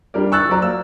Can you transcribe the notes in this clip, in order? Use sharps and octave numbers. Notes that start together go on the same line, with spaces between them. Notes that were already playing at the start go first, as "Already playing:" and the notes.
G3 D4 A#4 D5
C#6 E6 F#6 A6
F#3 C5 D5 A#5
A#3 E6